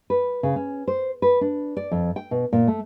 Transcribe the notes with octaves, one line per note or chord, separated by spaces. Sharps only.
B4
C#3
C#4
C5
B4
D4
D5
F2
G5
B2
A#2
A3